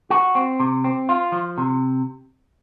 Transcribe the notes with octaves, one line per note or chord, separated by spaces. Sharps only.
F#4
C4
C3
C4
F4
F3
C3